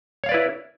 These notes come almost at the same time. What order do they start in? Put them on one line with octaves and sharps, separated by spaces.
C#5 F5 D5 B4 E4